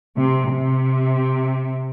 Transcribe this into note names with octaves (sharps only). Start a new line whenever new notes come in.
C3
C3